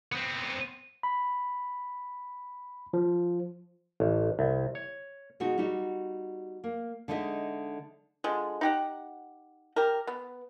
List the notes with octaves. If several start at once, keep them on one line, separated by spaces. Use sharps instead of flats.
B3 C4
B5
F3
A1
C2
C#5
B2 G#3 D#4 F#4
G3 D#4 F#4
A#3
D3 G#3 D#4 D#5 E5
D3 F3 G#3
D#4 G4 F#5
G4 A#4
B3